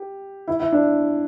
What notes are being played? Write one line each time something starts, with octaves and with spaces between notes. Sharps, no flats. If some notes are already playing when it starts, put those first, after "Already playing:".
Already playing: G4
E4
E4
D4